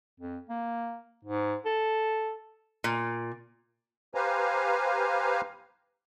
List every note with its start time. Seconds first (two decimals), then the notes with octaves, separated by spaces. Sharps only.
0.20 F2
0.49 A#3
1.25 G#2
1.66 A4
2.84 A#2
4.15 G4 B4 C5 F5 G#5 A#5